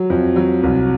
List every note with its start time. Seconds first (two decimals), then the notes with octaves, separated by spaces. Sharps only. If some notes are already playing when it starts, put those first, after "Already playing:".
Already playing: F#3
0.10 F2
0.36 F#3
0.63 C2